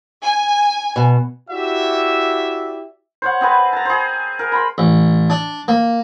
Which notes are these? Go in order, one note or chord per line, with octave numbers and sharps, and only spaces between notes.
G#5
B2
E4 F#4 G4 D5 E5
C5 C#5 F#5
C4 G#4 B4
A5 A#5
G#4 C5
A#4
B5 C6
A1
D4
A#3